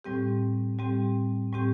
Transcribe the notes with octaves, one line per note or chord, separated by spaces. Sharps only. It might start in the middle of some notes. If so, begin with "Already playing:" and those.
A2 G3 C4 G4
A2 G3 C4 G4
A2 G3 C4 G4